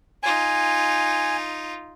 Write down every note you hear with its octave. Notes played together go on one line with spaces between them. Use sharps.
D#4 F4 G#5